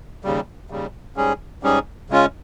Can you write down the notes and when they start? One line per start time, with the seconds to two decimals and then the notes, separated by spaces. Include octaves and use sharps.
0.24 D#2 C#3 G3
0.70 D#2 C#3 G3
1.16 G#2 G3 C#4 G#4
1.63 G#2 G3 C#4 G#4
2.10 C#3 G#3 C#4 F4